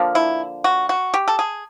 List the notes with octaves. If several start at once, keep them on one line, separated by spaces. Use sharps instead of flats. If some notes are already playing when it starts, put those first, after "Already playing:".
Already playing: D3 F3 A#3
E4
F#4
F#4
G4
A4
G#4